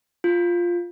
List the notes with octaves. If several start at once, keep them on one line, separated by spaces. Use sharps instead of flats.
F4